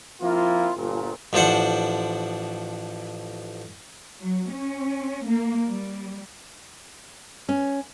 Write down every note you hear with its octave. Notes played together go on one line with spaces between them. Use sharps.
F3 A#3 C4 E4 F4
G1 A#2
A1 F3 D4 C5 F#5
F#3
C#4
A#3
G3
C#4